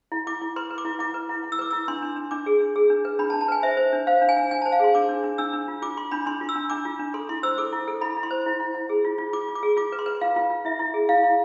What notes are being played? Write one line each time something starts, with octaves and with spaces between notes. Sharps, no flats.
E4
E4 D6
E4
B4 C6
B4
D6
E4
E4 D6
B4
E4
E4
E6
B4 D6
E4 E6
D4 C6
D4
D4
D4 D6
G#4
D4
G#4
D4
B4
D4 B5
A5
D4
A5
B4 G#5
C5 E5
C5
D4
C5 F5
D4
G#5
D4
D4 G#5
A5
C5
F5
G#4 C6
D4 D6
D4
D4
D4 E6
D4
F4
F4 D6
F4 C6
D4 B5
D4 C6
F4
E6
D4
D4 D6
F4
D4
A4 C6
E4 C6
C5 E6
A4 D6
E4
A4
E4 B5
E4
C6
C5
E4
E4
E4
G#4
F4
F4
F4 D6
F4
D6
G#4
F4 D6
B4
C6
B4
F4 F5
F4
F4
E4 E5
E4
G#4
E4 F5
E4